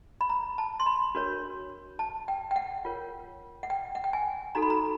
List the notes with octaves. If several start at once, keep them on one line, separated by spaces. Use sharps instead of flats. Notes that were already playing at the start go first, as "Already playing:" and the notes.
B5
A#5
A5
C6
B5
D4 F#4 A#4 C#5
A5
G5
G5
F#5
F4 A#4 C#5
F#5
G5
F#5
G5
G#5
D#4 F#4 A4 A#5
B5
A#5